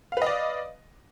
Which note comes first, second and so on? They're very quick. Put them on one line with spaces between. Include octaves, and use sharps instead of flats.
F5 B4 D#5 D5